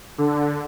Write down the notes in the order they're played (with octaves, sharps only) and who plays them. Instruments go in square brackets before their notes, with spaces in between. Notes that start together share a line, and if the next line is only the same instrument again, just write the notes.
[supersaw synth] D3